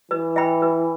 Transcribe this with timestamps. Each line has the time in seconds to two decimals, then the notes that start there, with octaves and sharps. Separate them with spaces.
0.11 E3 B4
0.36 E5 G5 B5
0.62 B4